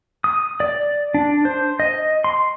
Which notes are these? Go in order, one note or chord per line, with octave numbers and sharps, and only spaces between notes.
D#6
D5
D4
C5
D#5
C6